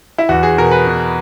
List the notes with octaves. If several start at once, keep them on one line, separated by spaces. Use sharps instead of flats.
E4
E2 F#4
G#4
B2 A#4
B4
B2